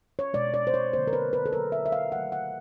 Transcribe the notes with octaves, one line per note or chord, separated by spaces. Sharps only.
C#5
B2 G#3 D5
D5
C5
C#5
D3 F#3 A#3 C5
A#4
B4
B4
A4
D3 F#3 A#3 A#4
E5
E5
F5
D#3 F#3 A3 F#5
F#5